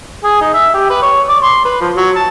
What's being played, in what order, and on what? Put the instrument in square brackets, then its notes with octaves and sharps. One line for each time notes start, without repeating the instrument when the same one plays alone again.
[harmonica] G#4
D#4
E5
G4
B4
C#5
D5
C6
B4
F3
F#3
A5